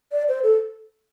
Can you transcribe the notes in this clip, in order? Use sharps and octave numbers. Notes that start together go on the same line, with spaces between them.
D5
C5
A4